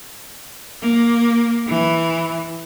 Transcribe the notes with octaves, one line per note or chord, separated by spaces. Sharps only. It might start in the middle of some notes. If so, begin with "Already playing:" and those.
A#3
E3